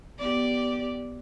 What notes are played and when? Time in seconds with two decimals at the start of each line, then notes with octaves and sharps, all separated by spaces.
0.19 B3 G4 D5